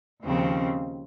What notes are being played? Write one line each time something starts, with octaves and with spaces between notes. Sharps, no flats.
D#2 C#3 F3 C4